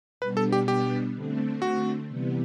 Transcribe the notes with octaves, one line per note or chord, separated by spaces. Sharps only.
B2 G3 B3 D4 B4
A4
G4
G4
D3 A3 C4
F#4
C3 E3 G3 B3